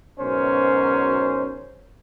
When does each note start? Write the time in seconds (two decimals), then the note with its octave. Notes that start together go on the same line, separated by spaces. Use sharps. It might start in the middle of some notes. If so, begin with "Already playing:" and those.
0.20 G#2 B2 F#3 C#4 A#4 C5